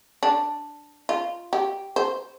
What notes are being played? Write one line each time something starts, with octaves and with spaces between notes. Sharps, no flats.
D4
F4
G4
C5